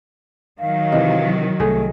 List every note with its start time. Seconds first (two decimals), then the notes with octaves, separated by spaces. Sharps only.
0.60 D#3 F#3 F5
0.92 C3 E3 D#5
1.60 C2 A3 G#4 A4